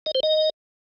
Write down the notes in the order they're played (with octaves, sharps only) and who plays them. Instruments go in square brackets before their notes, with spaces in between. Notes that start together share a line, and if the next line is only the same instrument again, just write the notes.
[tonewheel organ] D#5
C5
D#5